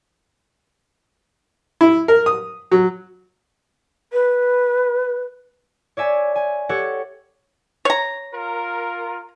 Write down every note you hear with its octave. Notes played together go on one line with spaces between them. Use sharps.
E4
A#4
D#6
F#3
B4
C#5 D5 E5 G#5
G#5
G4 A4 C#5 F#5
C#5 A#5
F4 A#4